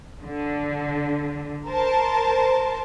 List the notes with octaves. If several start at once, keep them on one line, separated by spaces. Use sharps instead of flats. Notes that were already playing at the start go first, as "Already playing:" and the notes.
D3
A#4 C5 A5